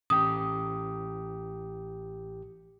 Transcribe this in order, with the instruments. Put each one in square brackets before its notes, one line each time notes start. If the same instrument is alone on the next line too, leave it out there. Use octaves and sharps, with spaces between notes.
[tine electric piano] A1 G4 [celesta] D#6